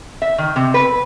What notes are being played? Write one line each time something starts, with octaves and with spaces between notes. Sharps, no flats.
E5
D#3
C3
B4